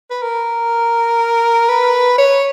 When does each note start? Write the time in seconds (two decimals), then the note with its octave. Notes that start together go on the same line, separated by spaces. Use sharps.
0.10 B4
0.22 A#4
1.69 B4
2.18 C#5